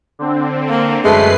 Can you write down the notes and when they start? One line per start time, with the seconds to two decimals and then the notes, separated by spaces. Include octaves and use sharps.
0.19 D3 C4
0.69 A#3
1.04 F#2 G#3 A3 B4 C7